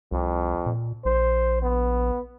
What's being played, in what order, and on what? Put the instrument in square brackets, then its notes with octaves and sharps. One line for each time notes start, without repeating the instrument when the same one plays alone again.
[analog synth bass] C2 [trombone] F2
[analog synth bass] A#2
[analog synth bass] A#1 [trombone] C5
[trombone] B3